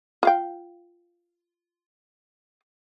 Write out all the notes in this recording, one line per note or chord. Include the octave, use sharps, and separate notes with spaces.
F4 F5 G5